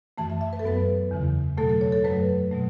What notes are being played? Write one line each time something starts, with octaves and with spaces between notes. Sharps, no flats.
F#2 E3 A3 A5
E5
E5
B4
A4
F#2 F#3 B3 B4
E2 C#3 E3
B2 F#3 A3 A4
A4
C#5
A4
F#2 F#3 A3 B4
B2 F#3 A3